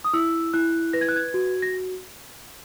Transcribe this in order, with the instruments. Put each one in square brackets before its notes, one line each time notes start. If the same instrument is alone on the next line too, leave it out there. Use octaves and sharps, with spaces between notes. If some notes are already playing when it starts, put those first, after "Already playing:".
[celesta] D#6
E4 E6
E4 F#6
B4 A#6
G#6
F#6
G#6
F#4
A#6